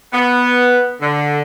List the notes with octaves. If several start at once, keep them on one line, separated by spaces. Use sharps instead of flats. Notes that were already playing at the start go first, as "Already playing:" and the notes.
B3
D3